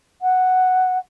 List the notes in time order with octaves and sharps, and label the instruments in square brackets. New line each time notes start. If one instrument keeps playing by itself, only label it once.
[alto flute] F#5